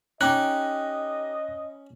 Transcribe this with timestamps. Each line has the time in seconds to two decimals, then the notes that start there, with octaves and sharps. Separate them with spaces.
0.21 C#4 D#4 G4 D#5 D6 F#6